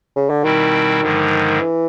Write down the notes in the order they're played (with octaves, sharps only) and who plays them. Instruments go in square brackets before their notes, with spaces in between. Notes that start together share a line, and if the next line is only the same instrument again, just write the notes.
[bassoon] C#3
D3
[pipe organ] B2 G3 C4 E4 [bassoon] D#3
[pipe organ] G2 D3 F3 G#3
[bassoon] E3